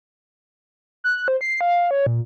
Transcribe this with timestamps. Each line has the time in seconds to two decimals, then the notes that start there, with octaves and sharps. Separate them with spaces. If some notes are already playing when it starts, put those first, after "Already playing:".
1.04 F#6
1.28 C5
1.41 C7
1.61 F5
1.91 C#5
2.06 A#2